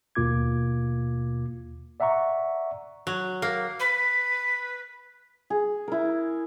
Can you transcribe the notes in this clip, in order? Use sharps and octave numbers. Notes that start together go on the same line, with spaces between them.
D#2 B2 A#3 F4 D6 G#6
D5 E5 F#5 A#5 C#6
F#3
A#3
B4
G#4
E4 A#4